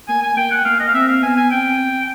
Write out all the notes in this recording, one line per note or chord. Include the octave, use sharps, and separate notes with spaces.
A#3 G#5
G#5
A#3 G5
F#5
A#3 F5
D#5
F5
C4 E5
F5
B3 G#5
G#5
C4 G5